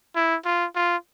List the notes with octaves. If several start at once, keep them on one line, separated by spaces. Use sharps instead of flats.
E4
F4
F4